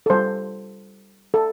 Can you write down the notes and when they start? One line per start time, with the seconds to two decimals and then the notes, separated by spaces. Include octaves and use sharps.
0.06 A4
0.10 G3 F4 C5
1.34 A4